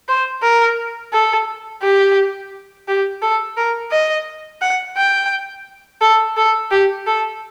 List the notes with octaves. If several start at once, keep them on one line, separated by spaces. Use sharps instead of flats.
C5
A#4
A4
G4
G4
A4
A#4
D#5
F#5
G5
A4
A4
G4
A4